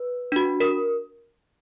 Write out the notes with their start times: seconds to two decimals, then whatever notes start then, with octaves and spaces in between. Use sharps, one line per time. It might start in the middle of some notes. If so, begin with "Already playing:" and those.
Already playing: B4
0.32 D4 F#4
0.60 A#4